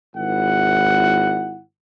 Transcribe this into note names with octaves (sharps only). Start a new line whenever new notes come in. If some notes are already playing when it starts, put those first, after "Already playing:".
G#1 E4 F#5